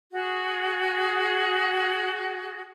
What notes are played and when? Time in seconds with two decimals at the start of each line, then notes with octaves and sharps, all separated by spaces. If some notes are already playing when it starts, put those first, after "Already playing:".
0.12 F#4 G#4